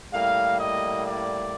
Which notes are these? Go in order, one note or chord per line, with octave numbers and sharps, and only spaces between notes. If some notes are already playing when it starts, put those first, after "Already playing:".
A2 G3 A#3 F5
D#5
D5